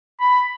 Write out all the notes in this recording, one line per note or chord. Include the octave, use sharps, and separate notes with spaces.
B5